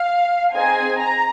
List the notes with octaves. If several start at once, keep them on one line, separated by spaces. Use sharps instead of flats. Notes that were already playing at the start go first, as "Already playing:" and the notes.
Already playing: F5
C4 D#4 G#4 G#5
A#5